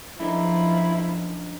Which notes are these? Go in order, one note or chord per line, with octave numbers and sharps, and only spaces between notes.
F#2 D3 F3 D#4 E4